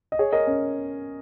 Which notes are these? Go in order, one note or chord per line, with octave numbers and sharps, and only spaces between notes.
D#5
G#4 C#5
A#4 D#5
C#4